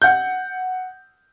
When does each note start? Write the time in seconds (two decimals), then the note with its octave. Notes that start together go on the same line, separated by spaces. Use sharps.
0.02 F#5 G6